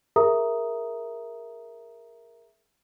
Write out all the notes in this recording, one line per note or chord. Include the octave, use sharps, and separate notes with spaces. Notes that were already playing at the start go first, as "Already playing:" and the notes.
G#4 A#4 E5 A#5 D#6